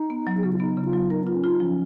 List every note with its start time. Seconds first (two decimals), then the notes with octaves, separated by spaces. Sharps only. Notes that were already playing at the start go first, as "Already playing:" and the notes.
Already playing: D#4
0.10 B3
0.27 F#3
0.37 G#4
0.43 C#3 F#4
0.53 F4
0.60 B3 D#4
0.77 C#3
0.85 F4
0.93 F#3
1.10 D#4 A#4
1.23 B3 F4
1.36 C#4
1.44 D#4 F4
1.60 F3 C#4